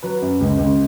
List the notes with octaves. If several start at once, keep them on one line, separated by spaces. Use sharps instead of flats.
F#3 B4
F#2
C#2
C#2